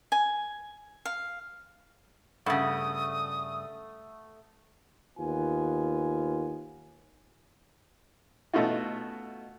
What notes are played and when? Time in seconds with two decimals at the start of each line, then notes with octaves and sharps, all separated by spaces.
0.12 G#5
1.05 F5
2.46 G2 C#3 A3 F#5 D#6
5.18 D#2 B3 F4 G#5
8.54 B2 A3 C#4 D#4 F4 F#4